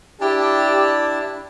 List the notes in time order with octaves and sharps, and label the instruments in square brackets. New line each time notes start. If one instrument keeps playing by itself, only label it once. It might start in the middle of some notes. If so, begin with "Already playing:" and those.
[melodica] D4 E4 A5 [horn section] G4 D5